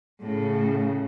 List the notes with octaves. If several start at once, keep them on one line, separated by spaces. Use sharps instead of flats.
A2 C#3